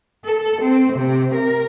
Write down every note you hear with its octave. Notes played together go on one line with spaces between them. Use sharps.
A4
C4
C3
A#4